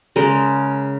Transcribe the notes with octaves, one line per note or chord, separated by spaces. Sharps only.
C#3 G#3 A#4 D#5